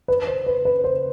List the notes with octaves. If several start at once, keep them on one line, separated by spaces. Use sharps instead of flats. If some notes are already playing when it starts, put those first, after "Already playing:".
B4
C5
B4
B4
C5